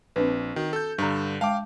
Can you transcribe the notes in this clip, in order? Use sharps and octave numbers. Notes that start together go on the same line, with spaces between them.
A#1 C4 D4 B4
D#3 F#4
A4 G6
G2 D3 D4 A#5
G#3 F5 G5 A5 D6